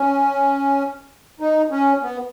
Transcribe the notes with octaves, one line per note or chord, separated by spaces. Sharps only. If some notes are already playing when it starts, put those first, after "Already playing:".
Already playing: C#4
D#4
C#4
B3